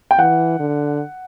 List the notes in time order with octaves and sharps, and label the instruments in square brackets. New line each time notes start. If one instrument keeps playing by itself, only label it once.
[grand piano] G5
[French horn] E3 [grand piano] F#5
[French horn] D3